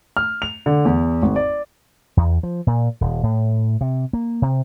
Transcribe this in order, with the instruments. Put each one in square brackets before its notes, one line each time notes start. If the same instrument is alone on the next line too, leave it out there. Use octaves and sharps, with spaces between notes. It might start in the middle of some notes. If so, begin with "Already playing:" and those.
[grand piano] F6
F7
D3
E2
G#1
D5
[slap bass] E2
F3
A#2
D#1
A2
C3
A#3
C3